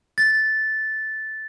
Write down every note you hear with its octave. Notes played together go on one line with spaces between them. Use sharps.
A6